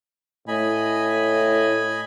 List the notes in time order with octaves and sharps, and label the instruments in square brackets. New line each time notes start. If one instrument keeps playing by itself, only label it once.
[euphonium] A2 [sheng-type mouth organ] D#5 G#5 B5